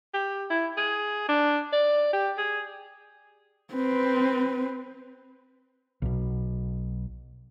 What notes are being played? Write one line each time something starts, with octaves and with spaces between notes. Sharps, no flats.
G4
E4
G#4
D4
D5
G4
G#4
C4 B4
B1 B2